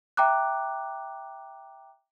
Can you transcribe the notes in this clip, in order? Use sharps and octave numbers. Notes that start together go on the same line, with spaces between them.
E5 G5 A#5 D6 F#6